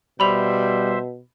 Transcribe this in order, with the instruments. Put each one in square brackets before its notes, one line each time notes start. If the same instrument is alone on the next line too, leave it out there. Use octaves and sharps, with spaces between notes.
[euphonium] B2 [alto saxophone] G3 [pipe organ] C5 E5 [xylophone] B5 F7